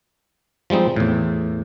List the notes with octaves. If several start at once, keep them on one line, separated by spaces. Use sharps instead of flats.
F3 G3 G#3 C4 D#4
E2 A2